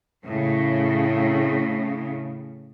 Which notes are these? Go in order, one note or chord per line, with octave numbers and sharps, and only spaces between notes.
A2 C#3